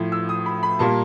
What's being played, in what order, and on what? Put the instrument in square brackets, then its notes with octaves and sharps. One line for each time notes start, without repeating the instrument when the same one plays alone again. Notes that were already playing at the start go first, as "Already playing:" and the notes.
Already playing: [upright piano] A2 F3 A3
E6
D#6
B5
B5
A#2 G3 A#3 A5